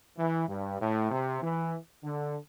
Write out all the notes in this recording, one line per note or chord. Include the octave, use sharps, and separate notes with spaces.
E3
G2
A2
C3
E3
D3